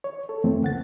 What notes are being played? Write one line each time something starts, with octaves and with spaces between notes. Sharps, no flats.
C#5
A4
F2 E3 A3 A#3 C4
C#2 F#5 A6